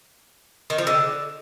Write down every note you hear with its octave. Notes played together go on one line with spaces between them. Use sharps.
D#3
F3
D3